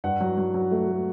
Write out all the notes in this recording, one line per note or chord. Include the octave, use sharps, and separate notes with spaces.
G2 F#5
F#3
F#3
F#3
A3
A3